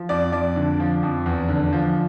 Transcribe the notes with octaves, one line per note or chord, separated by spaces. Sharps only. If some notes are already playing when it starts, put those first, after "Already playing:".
Already playing: F3
F2 D5
F2 D5
D3
F3
F2
E2
D3
F3